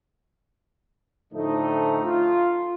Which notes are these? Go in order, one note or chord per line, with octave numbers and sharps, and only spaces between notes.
A2 D3 F3 A3 D#4
F4